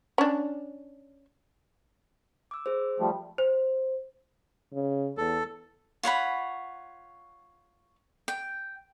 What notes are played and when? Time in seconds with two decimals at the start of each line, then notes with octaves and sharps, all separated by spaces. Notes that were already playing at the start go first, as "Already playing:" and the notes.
0.18 C#4 D4
2.51 D6 E6
2.66 G#4 C5
3.00 F3 G3 A3
3.38 C5
4.74 C#3
5.17 E2 A4
6.03 F4 C#5 F#5 B5
8.28 G5